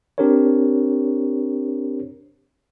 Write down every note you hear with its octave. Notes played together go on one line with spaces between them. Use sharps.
C4 D4 G4 A#4 C5 C#5